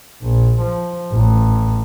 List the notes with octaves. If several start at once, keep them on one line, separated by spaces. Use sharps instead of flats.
A#1
F3
A1